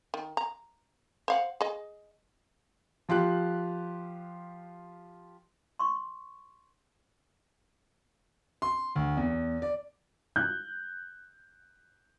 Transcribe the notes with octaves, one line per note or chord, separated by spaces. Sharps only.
D#3
A#5
C5 F5 F#5
G#4 D#5
F3 F4 G4 F#6
C6 C#6
C6
D2
E2
D5
F#6 G6